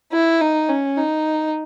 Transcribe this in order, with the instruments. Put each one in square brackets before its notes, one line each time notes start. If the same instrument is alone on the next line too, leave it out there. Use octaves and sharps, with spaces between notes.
[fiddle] E4
D#4
C#4
D#4